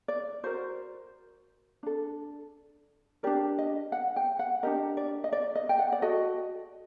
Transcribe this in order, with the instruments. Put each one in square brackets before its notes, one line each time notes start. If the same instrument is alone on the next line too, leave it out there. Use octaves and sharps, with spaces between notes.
[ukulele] D5
F#4 A#4 C5
D4 A4
D4 G4 A#4 D5
D#5
F#5
G5
F#5
D4 G4 A#4 D#5
D5
D#5
D5
D#5
G5
F#5
D5
F#4 A4 D#5